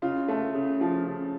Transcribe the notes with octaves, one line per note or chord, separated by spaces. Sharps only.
C#3 F4
A3
C#3
F3
C#3